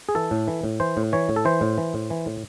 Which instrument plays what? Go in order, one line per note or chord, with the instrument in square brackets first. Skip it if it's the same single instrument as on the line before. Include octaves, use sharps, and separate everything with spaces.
[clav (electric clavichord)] G#4
E3 A4
A2
E3
A2
E3 C5
A2
E3 C#5
A2
A4
E3 C5
A2
E3
A2
E3
A2